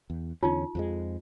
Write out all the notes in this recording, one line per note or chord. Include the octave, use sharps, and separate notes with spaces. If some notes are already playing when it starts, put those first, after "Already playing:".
E2
E2 D3 C#4 D#4 F4
F2 F3 G#3